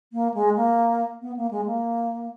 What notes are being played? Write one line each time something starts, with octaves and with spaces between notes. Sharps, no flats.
A#3
G#3
A#3
B3
A#3
G#3
A#3